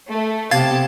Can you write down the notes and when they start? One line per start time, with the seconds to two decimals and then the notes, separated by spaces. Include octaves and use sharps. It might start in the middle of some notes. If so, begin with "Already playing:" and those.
0.10 A3
0.51 C3 B3 G4 F5 A5 G#6 A6